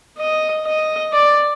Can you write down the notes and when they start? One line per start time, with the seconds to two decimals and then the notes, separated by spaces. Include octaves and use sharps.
0.18 D#5
0.65 D#5
1.13 D5